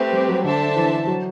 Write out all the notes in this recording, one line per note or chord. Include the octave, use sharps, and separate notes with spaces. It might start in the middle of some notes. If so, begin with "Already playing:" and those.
Already playing: A3 C4 G4 B4
G3
F#3
D3 D4 A4 C5 E5 A5
E3
F#3